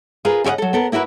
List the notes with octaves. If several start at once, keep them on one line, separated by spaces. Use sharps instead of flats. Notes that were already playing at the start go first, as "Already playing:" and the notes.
F4 G#4 A#4 B4
C#3 F#4 C#5 D#5 F#5
F#3 A4
B3 A4 A#4
A#3 E4 F#4 A#4 B4